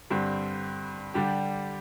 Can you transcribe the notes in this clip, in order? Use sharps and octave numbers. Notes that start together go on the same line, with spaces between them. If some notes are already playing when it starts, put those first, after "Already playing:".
G2 D3 G3 C4
D3 G3 D4 G4